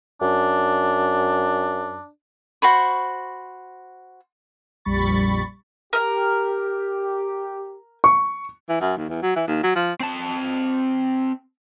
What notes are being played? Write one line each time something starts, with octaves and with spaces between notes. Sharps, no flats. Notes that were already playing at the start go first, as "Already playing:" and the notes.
F#2 D4
F#4 C5 B5 C#6
A#1 F2 G3 B5 C#6 A6
G4 A#4
C#6
E3
F#2
D#2
E2
F#3
E3
D#2
F#3
F3
C4 A5